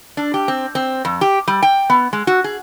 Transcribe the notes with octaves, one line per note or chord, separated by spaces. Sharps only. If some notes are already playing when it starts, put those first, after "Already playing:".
D4
G4
C4
C4
F2
G4
G3
G5
B3
G#3
F#4
G#4